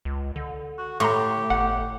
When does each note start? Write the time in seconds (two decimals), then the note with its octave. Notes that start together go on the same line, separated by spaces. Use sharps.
0.05 C#2
0.36 D3
0.78 F#4
1.00 A2 G4 A#5 C6 C#6
1.50 G1 F#5